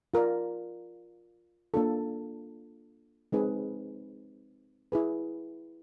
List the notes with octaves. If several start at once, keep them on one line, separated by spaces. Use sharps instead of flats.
F4 A#4 D5
A#3 D4 F4 A4
G#3 C4 D#4 G#4 B4
E4 G#4 B4